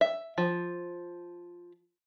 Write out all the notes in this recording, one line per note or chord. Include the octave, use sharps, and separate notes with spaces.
E5
F3